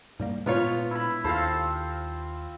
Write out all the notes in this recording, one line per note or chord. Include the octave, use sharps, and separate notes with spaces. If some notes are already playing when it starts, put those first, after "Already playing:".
G#2 G3 A#3
A#2 G#3 B3 D4 F4 C#5
E4 B5
D#2 C4 F4 A4 C5 F5